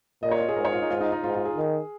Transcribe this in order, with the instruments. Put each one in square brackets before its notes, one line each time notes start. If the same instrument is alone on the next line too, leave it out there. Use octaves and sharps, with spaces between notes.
[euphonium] A#2 [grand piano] D#5
[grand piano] C#5
F4
G#4
[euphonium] G#2 [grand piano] A#4
[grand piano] C#5
F4
D#4
[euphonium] G#2 [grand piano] F4
[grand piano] D#4
D#4
[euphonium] G#2 [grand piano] F4
[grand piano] F4
G#4
[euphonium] D#3